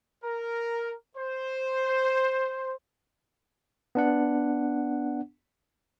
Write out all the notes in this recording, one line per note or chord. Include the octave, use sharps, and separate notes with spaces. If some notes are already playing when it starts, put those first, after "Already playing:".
A#4
C5
B3 D4 F#5